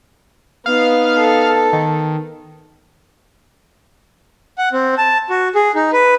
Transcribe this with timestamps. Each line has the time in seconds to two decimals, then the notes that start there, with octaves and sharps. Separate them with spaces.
0.66 B3 D#4 F5
1.18 A4
1.73 D#3
4.58 F#5
4.72 C4
4.98 A5
5.30 F#4
5.55 G#4
5.75 D#4
5.93 B4